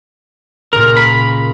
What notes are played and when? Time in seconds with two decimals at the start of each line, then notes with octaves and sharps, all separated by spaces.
0.73 C#2 A#2 A#4
0.97 B5